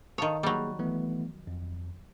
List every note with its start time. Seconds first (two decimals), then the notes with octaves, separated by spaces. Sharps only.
0.18 D#3 C#5 F5 A5 D#6
0.43 F#3 G3 A#3 G#4
0.79 E3 A3 B3
1.47 F2